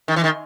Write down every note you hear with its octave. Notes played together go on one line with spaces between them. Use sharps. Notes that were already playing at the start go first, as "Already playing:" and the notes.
D#3
E3
D#3